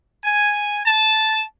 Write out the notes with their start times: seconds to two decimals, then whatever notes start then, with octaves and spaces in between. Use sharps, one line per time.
0.24 G#5
0.86 A5